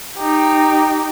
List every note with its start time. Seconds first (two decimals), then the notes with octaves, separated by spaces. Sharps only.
0.18 D#4 G4